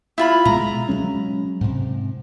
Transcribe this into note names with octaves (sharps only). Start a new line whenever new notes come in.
E4 F4 B5
B2 G#3 A#5
F#3 G#3 C#4
G#2 C3